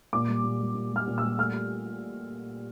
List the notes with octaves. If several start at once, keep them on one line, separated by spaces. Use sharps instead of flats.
A#2 D6
G3
A#2
G3
A#2
G3 F6
A#2
G3 E6
A3 F6